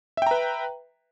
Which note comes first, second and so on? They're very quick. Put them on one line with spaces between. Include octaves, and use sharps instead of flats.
E5 G5 A#5 B4